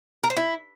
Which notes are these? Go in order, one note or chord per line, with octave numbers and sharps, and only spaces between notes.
A#4
C5
E4